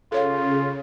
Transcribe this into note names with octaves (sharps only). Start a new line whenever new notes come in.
C#3 F4 A4 C#5 F5